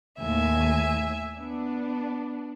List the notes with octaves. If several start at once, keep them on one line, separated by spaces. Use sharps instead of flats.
D#2 A2 E5 G#5
B3 D4